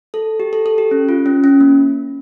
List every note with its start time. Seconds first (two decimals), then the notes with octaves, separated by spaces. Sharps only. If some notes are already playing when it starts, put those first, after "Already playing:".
0.14 A4
0.40 G4
0.53 A4
0.66 A4
0.78 G4
0.91 C#4
1.09 F4
1.26 C#4
1.44 C#4
1.61 A#3